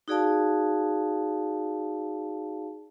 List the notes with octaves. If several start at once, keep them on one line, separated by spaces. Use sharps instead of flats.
D#4 F#4 G#4 D5 F5 A5